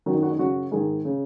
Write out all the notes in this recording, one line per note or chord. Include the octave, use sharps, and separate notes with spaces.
F#2 D#3 F#4
D#4
F#4
D#4
F#2 C#3 F#4
G#2 D#3 G#4
C#3